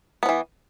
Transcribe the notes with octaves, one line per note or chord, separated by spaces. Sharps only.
E3 F3 B3